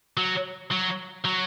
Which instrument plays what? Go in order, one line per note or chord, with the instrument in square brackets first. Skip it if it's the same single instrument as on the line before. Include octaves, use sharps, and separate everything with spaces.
[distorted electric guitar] F#3
F#3
F#3